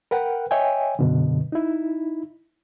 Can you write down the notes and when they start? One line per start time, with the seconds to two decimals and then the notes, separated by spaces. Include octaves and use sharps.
0.11 A#4 B4 F#5 G5
0.51 C#5 D#5 E5 G5 G#5
0.99 F#2 B2 D3
1.52 D#4 E4